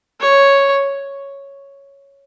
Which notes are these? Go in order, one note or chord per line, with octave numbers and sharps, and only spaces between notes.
C#5